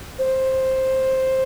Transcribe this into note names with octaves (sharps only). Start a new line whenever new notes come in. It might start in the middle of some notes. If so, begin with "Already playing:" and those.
C5